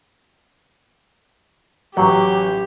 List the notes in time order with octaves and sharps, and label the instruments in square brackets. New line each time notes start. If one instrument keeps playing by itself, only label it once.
[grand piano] A1 F#5 [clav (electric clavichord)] F#3 [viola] G4